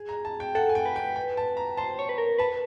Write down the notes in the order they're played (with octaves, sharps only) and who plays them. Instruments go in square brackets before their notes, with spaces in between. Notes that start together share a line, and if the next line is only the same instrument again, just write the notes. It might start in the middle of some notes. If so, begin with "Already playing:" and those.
Already playing: [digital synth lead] G#4
[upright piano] A#5
A5
G5
[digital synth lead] A4 [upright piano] F#5
[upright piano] G#5
G5
[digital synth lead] B4
[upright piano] G5
G5
A5
A#5
[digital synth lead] C5 [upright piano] A5
[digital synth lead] C#5
B4
A#4
[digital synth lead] B4 [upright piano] A5